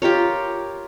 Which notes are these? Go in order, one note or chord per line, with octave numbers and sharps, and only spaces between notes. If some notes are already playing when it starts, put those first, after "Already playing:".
F4 G4 A#4 C#5